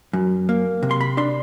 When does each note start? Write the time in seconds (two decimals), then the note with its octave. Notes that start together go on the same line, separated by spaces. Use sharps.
0.13 F#2
0.49 A#3
0.83 C3
0.91 C6
1.01 B5
1.17 D4 C6